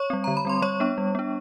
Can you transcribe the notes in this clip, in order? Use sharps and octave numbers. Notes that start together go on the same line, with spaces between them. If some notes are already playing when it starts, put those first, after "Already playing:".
Already playing: C#5 C#6
G3 C4
D3 A#5
B5
G3 C4 C6
G3 C#5 C#6
B3 D4
G3
B3 D4